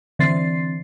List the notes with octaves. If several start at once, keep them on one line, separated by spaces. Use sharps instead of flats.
D3 E3 C4 A6 C7